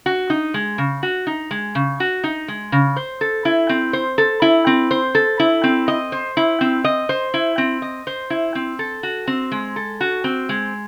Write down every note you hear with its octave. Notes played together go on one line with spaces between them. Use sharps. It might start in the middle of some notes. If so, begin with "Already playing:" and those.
F#4
D#4
G#3
C#3
F#4
D#4
G#3
C#3
F#4
D#4
G#3
C#3
C5
A4
E4
C4
C5
A4
E4
C4
C5
A4
E4
C4
D#5
C5
E4
C4
D#5
C5
E4
C4
D#5
C5
E4
C4
A4
F#4
C4
G#3
A4
F#4
C4
G#3